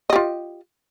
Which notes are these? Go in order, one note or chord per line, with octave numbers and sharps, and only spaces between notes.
F4 G4 D#5